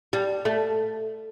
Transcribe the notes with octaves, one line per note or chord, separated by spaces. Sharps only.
G3
A3